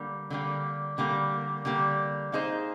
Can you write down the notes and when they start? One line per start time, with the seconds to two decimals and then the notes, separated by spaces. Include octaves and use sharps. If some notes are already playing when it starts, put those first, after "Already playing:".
Already playing: D3 G3 A#3
0.30 D3 G3 A#3
0.98 D3 G3 A#3
1.65 D3 G3 A#3
2.32 A#3 D#4 G#4 C5